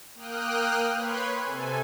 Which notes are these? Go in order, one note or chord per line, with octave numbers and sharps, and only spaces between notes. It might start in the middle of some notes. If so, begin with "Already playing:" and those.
A#3 G5 D#6 F6 F#6
B4 C#5 B5 C6 F#6 G#6
C3 A4 G#5